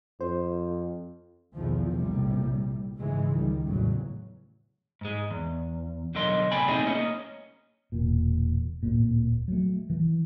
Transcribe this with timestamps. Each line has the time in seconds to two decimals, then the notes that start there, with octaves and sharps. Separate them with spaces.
0.21 F2 C5
1.54 B1 E2 D#3 F3
1.89 A#1 A2 C3 G3
2.97 G#2 C#3 E3 G#3
3.32 C#2 D#3 G3
3.64 A1 E2 C#3 F#3
5.01 G#2 G#3
5.31 E2
6.15 B1 D3 F#3 A#4 D#5 C6
6.51 C3 A3 D5 G5 G#5 B5
6.68 A3 C4 D#4 E4 G#4
6.85 A#3 C#4 D#5
7.92 E1 A#2
8.83 D1 G1 A#2
9.48 F#3 A3
9.90 E3